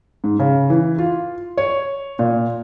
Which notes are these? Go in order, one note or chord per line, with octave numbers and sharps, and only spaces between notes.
G#2
C#3
E3
F4
C#5
A#2